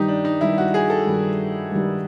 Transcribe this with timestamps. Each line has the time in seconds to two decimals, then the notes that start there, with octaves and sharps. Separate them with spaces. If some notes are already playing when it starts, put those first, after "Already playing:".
Already playing: G2 D#3 G3 D#4 G4
0.08 D4
0.25 D#4
0.41 G2 D#3 G3 E4
0.58 F#4
0.74 G#4
0.90 A4
1.06 G2 D#3 G3
1.71 G2 D#3 G3